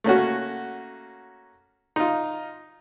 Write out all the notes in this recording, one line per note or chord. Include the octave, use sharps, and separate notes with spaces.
A3 A#3 C#4 F#4
D#4 F4